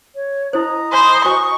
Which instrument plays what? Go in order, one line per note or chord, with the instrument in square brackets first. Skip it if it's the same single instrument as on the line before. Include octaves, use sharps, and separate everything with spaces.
[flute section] C#5
[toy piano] E4 C5 [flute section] D#5 A#5 D#6
[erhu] C5 [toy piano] G#5 B5
[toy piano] F#4 C5 G#5 [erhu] C#6